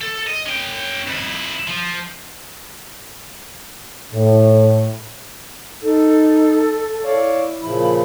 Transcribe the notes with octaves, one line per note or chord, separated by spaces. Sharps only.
A4
D#5
C#4 G5
F2 E4
F3
A2
D#4 A4
E4 C#5 D5 F5
A#2 C#3 F3 B5